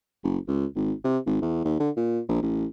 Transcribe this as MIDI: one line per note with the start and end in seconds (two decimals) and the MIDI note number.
0.23 0.38 30
0.48 0.66 37
0.76 0.93 32
1.04 1.18 48
1.26 1.38 32
1.42 1.63 40
1.65 1.77 39
1.80 1.90 50
1.97 2.20 46
2.29 2.41 34
2.42 2.66 33